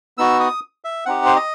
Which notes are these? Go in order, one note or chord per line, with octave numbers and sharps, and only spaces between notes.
B3 D#4 F#4 E6
D#6
E5
C4 D#4 G4 F#5
C5
D#5